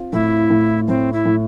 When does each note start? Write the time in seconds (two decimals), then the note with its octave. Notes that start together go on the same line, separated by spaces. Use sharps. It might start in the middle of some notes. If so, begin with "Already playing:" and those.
Already playing: C4 F4
0.13 A2 E4
0.50 A2
0.88 A2 C4
1.13 E4
1.26 A2